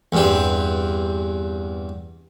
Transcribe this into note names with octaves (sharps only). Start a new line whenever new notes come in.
E2 G2 C4